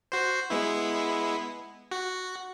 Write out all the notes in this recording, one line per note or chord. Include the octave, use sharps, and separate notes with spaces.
F#4 C5
G#3 B3 E4
F#4